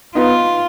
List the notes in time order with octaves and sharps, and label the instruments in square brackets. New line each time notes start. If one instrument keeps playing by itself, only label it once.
[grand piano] B3 D#4 [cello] F4